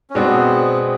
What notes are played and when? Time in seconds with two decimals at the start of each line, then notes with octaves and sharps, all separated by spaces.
0.10 C#4
0.15 B2 G#3 B3 C4 D4 F#4